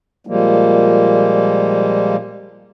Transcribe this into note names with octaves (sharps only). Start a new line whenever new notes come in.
A#2 F3 G3 G#3 A#3